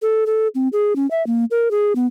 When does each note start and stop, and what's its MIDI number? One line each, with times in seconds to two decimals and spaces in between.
0.02 0.24 69
0.26 0.48 69
0.55 0.68 60
0.73 0.96 68
0.96 1.09 61
1.11 1.25 76
1.27 1.45 58
1.51 1.71 70
1.71 1.93 68
1.96 2.06 59